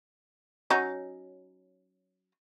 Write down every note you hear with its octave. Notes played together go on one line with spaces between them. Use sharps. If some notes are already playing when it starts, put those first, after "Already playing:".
F#3 C#4 D#4